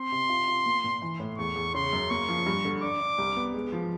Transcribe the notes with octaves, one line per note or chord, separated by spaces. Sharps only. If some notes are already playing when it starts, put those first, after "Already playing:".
Already playing: C4 C6
C3
F4
F4
A#3
A#2
E3
A2
E2 C#6
E2
C#3 C6
F#2
A#3 C#6
F3
G2
D3
D4 D6
D4
C2
B3
G#3
F3